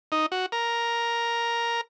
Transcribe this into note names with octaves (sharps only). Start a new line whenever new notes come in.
D#4
F#4
A#4